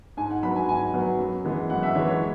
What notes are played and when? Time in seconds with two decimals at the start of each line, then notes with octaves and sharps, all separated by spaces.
0.17 G#2 G#5
0.30 F#5
0.43 F#3 B3 B5
0.56 G#5
0.68 G#2 G#5
0.94 F#3 B3
1.19 F#2
1.45 E3 G#3 B3
1.70 F#2 F#5
1.83 E5
1.95 E3 G#3 B3 C#5
2.08 C#5